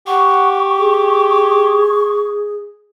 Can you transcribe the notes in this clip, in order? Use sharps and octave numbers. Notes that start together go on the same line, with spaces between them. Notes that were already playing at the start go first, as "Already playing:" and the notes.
G4 F#5 C#6
G#4